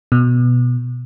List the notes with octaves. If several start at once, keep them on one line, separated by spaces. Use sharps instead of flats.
B2